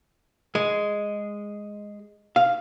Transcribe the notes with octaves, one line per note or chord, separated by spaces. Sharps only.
G#3
F5